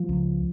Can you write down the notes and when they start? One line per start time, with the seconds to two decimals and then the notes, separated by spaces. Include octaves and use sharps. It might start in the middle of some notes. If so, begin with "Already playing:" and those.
Already playing: F3
0.09 C#2